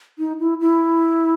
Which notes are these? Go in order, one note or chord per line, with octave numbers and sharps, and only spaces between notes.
D#4
E4
E4